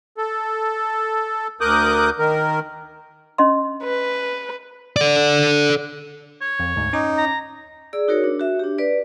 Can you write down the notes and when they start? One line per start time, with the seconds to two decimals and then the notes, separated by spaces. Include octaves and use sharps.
0.17 A4
1.61 D2 A#4 D6 D#6 F#6 G6
2.19 D#3 A#4
3.38 C#4 D#5 C6
3.83 B4
4.97 A4 D5
6.41 C#5
6.60 F2
6.76 D2 G#2
6.93 C#4 D#4 D6
7.18 A#5
7.93 G#4 D5 E6
8.08 D#4 F#4 A#4 C#5
8.24 D4
8.39 F#4 E5
8.59 D4 G4
8.78 B4 D5